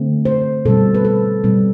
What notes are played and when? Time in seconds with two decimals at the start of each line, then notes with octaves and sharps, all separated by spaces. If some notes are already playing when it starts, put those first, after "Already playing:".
Already playing: D3 A3 C4
0.25 C5
0.65 B2 G3 C4 A4
0.95 B4
1.05 A4
1.44 B2 G3 C4